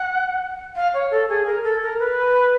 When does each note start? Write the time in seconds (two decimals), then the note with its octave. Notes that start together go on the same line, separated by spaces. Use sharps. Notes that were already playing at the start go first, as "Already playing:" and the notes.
Already playing: F#5
0.76 F5
0.94 C#5
1.11 A4
1.29 G#4
1.46 A#4
1.64 A4
1.82 A#4
1.99 B4